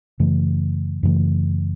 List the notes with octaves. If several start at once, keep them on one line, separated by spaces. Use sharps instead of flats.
F#2 C#3 E3 A3
F#2 C#3 E3 A3